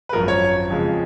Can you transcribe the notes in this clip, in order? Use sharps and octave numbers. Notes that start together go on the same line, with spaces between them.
B4
G#1 F#2 F3 A#4
C#5
F2 C#3 F3 G#3